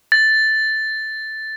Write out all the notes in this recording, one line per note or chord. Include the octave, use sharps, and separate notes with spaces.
A6